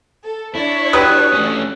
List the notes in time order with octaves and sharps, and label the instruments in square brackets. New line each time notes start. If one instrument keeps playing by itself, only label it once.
[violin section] A4
[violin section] D4 C#5 D5 [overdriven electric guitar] E4
[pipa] F#3 G4 B4 [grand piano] D#6 F#6
[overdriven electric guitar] A3 C#4